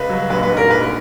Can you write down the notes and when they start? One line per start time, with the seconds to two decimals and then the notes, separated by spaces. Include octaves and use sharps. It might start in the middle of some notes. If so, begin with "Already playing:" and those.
Already playing: C#2 B4
0.09 F#3
0.29 A#1 B4
0.43 B4
0.50 G#2
0.57 A#4
0.70 A#1 B4